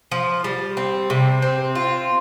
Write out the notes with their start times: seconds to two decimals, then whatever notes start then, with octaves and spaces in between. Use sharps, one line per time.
0.12 F3
0.44 G3
0.77 C4
1.10 C3
1.42 C4
1.75 F4